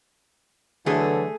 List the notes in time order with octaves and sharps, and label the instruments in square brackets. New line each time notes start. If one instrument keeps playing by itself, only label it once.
[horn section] D3 E3 F#3 [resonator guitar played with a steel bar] A3 G#4